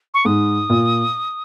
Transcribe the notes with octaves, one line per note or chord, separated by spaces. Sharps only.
C#6
G#2 D#6
A#2